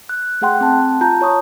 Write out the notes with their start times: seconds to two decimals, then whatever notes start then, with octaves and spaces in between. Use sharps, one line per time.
0.09 F#6
0.41 A3 G#4 F#5 G5 C6 F#6
0.61 C4 A5
1.01 F4 A5 A#5 G6
1.21 F4 C#5 C#6 D#6